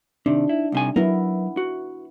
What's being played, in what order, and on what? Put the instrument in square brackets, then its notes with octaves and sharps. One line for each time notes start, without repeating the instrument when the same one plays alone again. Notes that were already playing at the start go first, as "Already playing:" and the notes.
[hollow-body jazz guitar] C3 D#3 [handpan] D4 D#4
[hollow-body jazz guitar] E4
C2 C3 G#5
[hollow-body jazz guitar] F#3 A#4 [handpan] B3 E4
[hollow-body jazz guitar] F#4